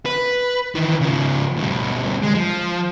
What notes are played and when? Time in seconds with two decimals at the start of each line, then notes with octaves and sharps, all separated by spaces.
0.06 B4
0.75 D#3 E3
1.01 C#3 F3
1.57 D2 G3
2.23 G#3
2.35 F3